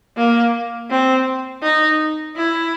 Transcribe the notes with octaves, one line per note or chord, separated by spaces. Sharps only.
A#3
C4
D#4
E4